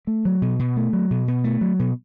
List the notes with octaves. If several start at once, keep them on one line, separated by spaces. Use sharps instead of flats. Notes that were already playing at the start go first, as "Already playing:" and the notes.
A3
F#3
B2
B2
A3
F#3
B2
B2
A3
F#3
B2